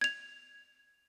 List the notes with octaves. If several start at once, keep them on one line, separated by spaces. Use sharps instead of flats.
G#6 F7